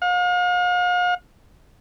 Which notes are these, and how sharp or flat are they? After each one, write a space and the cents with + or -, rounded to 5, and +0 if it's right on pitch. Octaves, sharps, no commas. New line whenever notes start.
F5 +45